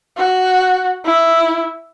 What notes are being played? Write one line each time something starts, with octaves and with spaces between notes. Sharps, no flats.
F#4
E4